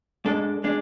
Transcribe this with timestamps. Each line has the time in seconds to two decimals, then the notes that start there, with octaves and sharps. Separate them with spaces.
0.25 G#2 G#3 D4 A4
0.64 G#3 D4